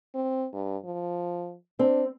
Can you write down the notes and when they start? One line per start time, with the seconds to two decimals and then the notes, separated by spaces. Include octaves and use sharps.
0.14 C4
0.53 G2
0.85 F3
1.79 C4 D4